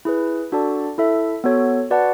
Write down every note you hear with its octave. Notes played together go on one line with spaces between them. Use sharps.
E4 G#4 B4
D4 F#4 A4 D5 A5
E4 A4 E5
B3 F#4 A4 C#5
F#4 B4 D5 F#5 A5